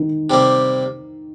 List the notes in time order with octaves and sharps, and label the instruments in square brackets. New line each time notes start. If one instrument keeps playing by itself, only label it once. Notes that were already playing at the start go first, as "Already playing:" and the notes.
Already playing: [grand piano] D#3
[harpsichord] C3 G3 A#3